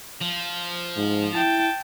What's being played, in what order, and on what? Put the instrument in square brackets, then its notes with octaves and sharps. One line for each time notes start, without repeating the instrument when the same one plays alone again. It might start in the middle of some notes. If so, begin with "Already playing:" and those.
[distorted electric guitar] F3
[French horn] G#2
[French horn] E4 [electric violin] G5 A5